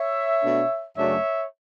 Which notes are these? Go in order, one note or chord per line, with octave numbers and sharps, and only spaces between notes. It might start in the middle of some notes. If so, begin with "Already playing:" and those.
Already playing: C#5 E5
B2 A3 D4
F#2 C#3 F#3 A3 D4 C#5 E5